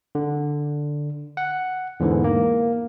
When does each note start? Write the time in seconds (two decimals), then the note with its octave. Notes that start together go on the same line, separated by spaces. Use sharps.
0.15 D3
1.37 F#5
2.00 E2 G#2 D3 E3
2.24 A#3